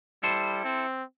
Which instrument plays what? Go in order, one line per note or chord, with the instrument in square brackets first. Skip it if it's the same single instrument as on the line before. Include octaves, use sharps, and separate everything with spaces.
[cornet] G3 [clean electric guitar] E4 A4 C5
[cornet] C4